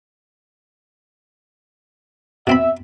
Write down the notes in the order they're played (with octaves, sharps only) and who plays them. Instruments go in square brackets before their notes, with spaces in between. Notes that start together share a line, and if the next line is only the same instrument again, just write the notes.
[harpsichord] B2 C4 B5 [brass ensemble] E5